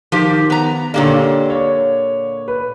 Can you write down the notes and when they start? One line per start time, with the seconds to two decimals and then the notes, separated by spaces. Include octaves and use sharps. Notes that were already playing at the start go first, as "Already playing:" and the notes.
0.12 D#3 F3 G4
0.50 B3 A#5
0.94 A#2 D3 A#3 D4 G4 C#5
1.50 C#5
2.48 B4